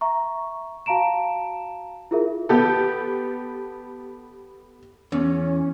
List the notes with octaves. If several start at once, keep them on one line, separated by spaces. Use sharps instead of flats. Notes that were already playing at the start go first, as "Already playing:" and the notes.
E5 A#5 C#6
F#4 F5 A5 A#5 D7 E7
E4 F4 G#4 A#4 E5
B3 G4 A4
E2 C#4